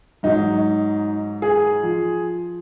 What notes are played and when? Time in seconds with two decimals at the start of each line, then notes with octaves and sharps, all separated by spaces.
0.23 G#2 F#3 D#4
1.42 G#4
1.83 F3